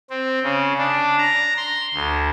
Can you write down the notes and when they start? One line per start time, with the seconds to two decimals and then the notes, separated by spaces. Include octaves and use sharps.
0.10 C4
0.44 C#3
0.78 D4
1.18 A#5
1.57 C6
1.94 D2